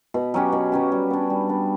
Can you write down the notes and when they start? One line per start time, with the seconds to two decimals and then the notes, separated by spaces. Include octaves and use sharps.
0.14 B2
0.34 F#3 C#4 G4
0.52 B2
0.72 F#3 C#4 G4
0.92 G3
1.10 B3 D4
1.30 G3
1.49 B3 D4